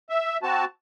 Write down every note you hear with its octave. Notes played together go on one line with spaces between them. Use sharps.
E5
C4 F#4 A5